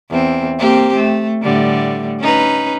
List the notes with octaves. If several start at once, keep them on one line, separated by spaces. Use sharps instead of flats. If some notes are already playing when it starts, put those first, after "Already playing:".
E2 C4
A#3 C4 G4
A3
A2 D3 G3
C#4 D#4 B4